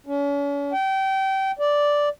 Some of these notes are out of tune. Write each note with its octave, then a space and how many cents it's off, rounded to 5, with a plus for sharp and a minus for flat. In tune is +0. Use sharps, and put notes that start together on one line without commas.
C#4 +40
G5 -25
D5 -5